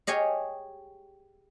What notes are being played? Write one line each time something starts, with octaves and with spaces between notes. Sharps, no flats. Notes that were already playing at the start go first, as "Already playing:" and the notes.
G4 G#4 C#5 D#5 F5